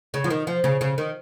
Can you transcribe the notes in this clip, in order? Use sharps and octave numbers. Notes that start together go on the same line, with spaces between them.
C#3
F3
D#3
F3
C#3
C#3
D#3